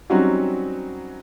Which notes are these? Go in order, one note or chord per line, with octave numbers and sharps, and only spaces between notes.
F#3 G3 C4 C#4 D#4 F#4